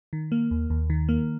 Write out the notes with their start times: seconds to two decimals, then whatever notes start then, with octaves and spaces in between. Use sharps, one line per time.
0.13 D#3
0.32 A#3
0.51 D#2
0.70 D#2
0.90 D#3
1.09 A#3